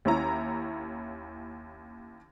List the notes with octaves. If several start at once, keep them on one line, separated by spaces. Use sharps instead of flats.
D#2 C#4 E4 A#5